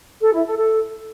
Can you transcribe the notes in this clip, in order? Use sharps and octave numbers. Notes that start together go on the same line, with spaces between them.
A4
E4
A4
A4